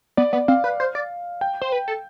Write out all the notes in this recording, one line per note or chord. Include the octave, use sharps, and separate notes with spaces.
B3 D5
B3 D5
C4 F5
B4
C5
D5
G5
C5
B4
A4